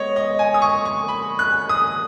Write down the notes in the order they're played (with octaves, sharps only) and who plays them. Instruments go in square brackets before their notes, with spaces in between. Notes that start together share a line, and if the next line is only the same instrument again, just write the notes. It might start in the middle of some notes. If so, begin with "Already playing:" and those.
Already playing: [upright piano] G#3 B3 C#5 D#5
D#5
G#5
D#6
C#6
C#6
B5
F#6
D#6